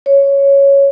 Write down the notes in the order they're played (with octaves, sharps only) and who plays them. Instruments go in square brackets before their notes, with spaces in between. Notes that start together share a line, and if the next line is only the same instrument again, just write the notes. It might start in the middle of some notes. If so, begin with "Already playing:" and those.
[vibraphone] C#5